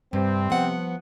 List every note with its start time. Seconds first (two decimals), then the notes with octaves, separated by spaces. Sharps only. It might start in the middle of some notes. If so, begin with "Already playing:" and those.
0.13 G2 C3 C4
0.50 F3 B3 F#5